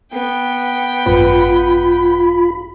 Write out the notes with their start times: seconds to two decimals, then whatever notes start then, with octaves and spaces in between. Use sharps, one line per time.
0.11 B3 G5
1.06 G#1 F#2 F4 B4 B5